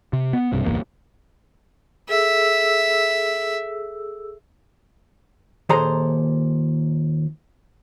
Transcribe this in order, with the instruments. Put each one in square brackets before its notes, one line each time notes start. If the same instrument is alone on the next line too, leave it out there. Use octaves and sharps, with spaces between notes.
[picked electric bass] C3
B3
B1 G2 C3
D1 G1 E2 A#3
[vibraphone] G#4 A4 E6 [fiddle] E5
[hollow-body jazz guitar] D#2 A#2 G#4 A4 C5 A#5